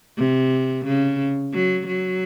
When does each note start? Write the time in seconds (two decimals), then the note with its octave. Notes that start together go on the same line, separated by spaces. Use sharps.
0.18 C3
0.85 C#3
1.53 F#3
1.87 F#3